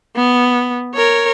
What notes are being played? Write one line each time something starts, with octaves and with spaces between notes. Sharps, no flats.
B3
A#4 C#5